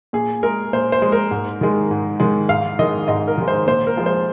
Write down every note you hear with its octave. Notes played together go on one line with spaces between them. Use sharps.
A#2 G#4
G#3 A#4
A#2 C5
C5
G#3
A#4
G#2
D#3 G#3
G#2
D#3 G#3
G#2 F5
D#3 G#3 D#5
G#2 D#5
A#4
D#3 G#3
C5
A#2 C5
A#4
F3 G#3
C5